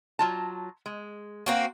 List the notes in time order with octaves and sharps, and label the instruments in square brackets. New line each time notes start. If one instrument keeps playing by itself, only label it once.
[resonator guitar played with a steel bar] F#3 F4 A5
G#3
[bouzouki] A#3 C4 F#4